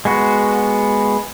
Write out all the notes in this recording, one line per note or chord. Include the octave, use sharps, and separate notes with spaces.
G#3 B3 F#4